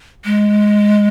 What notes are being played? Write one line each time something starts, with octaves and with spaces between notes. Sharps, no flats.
G#3